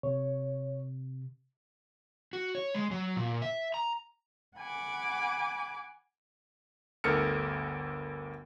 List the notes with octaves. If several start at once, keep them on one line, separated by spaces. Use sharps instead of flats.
C3 C#5
F#4
C#5
G#3
F#3
A#2
E5
A#5
F#5 G#5 B5 D6
G1 D2 A4 A#4 F6 C#7